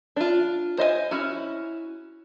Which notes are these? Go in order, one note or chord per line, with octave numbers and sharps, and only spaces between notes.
D4 F4
C5 D#5 E5 G#5
C#4 E4 F#4